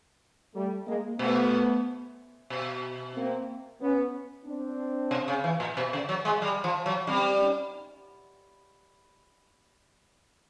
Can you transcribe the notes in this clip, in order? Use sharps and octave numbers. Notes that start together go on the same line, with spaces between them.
G3 A3
G#3 A#3
B2 A3 B3
B2
A#3 C4
B3 C#4
C4 D4
C3
C#3
E3
A#2
B2
C#3
F#3
G#3
G3
F3
F#3
G3 C4 D4
C#4 D#4